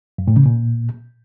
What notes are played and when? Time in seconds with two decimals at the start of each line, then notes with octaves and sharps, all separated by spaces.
0.18 F#2
0.28 A2
0.37 C#3
0.46 A#2